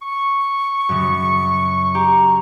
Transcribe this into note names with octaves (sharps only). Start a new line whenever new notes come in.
C#6
F#2 C#3
G4 A#5